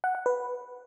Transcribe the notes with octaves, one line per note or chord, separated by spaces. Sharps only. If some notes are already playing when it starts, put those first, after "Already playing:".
F#5
F#5
B4